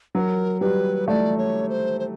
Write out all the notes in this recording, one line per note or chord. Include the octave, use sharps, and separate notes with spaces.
F#3 B4
A#4
G3 B4
A3 D5
C#5
C5
C5